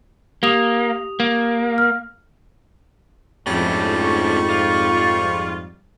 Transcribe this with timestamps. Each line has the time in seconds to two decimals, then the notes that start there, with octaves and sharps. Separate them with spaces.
0.43 A#3 G4 D#6 F7
1.20 A#3
1.78 F6
3.47 F2 G#2 G3 A3 C#4 E4
4.00 C#6
4.49 F4